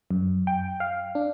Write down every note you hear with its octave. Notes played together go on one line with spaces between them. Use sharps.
F#2
G5
F5
D4